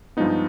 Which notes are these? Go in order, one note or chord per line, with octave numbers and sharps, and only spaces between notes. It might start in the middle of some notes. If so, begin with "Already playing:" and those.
G2 F3 G#3 B3 D#4